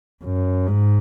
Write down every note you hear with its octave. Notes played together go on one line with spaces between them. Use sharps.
F#2
G#2